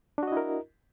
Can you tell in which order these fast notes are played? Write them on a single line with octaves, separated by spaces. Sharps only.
D4 F#4 D#5 E4 A#4